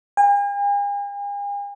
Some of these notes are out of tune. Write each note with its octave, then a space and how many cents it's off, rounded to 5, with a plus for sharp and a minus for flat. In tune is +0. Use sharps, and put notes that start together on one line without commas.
G#5 -45